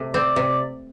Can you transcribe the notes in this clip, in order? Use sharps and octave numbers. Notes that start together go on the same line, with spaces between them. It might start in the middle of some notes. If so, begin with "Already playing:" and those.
Already playing: C3 A3
C4 D5
C3